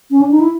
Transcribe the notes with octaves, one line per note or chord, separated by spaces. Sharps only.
C#4
D4
D#4
E4